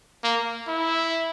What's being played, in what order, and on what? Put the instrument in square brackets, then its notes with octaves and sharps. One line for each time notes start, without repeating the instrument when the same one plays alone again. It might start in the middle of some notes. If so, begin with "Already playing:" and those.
[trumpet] A#3
E4